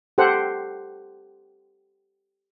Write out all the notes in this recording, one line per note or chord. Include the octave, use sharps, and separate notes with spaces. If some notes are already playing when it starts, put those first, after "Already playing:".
G4 A4 C5 F#5